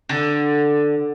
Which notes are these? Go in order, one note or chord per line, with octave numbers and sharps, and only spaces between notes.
D3